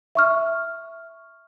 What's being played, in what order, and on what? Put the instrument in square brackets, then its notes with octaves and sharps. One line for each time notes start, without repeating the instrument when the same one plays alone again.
[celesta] E5 C#6 F6